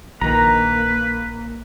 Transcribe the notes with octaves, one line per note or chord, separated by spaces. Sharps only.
A#1 D#3 A#3 B4 A#5